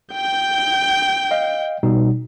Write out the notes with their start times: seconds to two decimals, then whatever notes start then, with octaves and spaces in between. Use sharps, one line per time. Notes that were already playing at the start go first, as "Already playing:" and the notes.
0.14 G5 G6
1.31 D#5 F5
1.83 B2 G3 D#4